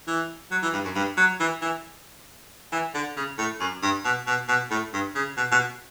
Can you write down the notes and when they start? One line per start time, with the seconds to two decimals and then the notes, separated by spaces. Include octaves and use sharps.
0.07 E3
0.51 F#3
0.63 E3
0.73 G2
0.85 F#2
0.96 G2
1.18 F#3
1.40 E3
1.62 E3
2.72 E3
2.94 D3
3.17 C#3
3.38 A2
3.60 F#2
3.82 G2
4.05 B2
4.27 B2
4.48 B2
4.71 A2
4.93 G2
5.15 C#3
5.37 B2
5.52 B2